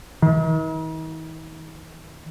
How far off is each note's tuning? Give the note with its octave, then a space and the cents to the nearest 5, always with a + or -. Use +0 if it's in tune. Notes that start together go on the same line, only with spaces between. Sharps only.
D#3 +45